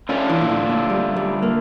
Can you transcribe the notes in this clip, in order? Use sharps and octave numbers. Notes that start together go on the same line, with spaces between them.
D3 A3 C#4 D4 F4
E3
A#2
A2
A#2
G3
G3
A#3